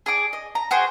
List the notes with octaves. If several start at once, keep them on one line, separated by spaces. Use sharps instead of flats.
G#4 D5 D6
D#5
A#5
F#4 G#4 C5 G5